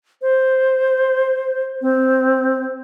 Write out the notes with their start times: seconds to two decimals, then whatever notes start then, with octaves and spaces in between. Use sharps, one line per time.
0.22 C5
1.82 C4